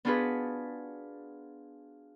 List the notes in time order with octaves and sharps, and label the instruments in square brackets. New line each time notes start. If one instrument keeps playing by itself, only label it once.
[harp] B3 D4 F4 F#4 G#4 B4